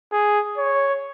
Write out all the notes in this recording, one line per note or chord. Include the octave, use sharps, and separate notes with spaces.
G#4
C#5